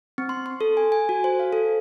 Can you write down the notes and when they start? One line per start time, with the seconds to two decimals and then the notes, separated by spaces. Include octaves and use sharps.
0.18 C4
0.29 C6
0.46 C6
0.61 A4
0.77 G#5
0.92 G#5
1.09 F#4
1.24 C5
1.39 F5
1.53 A4